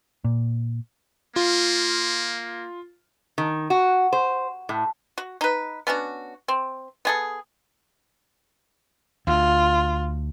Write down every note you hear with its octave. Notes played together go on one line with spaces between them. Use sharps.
A#2
A#3 F4
D#3
F#4
C5
A2
F#4
D#4 B4
B3 C#4 D4 F#4
C4
B3 G#4 A4
D2 F4